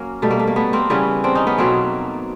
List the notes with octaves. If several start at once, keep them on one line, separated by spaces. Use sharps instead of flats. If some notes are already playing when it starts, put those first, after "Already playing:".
Already playing: F#3 A#3 C#4
B2 G3 A3
A#3
A3
A#3
A3 B3
A#3 C4
C#3 E3 G3 B3 C#4
C4 D4
C#4 D#4
B3 C#4
B2 F#3 A3 A#3 C4